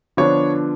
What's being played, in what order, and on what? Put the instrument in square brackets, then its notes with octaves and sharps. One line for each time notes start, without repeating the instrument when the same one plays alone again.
[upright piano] D3 F3 B3 D4 C#5